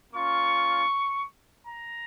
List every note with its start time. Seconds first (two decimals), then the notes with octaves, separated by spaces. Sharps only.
0.13 A#3 C#4 F4 C#6
1.66 A#5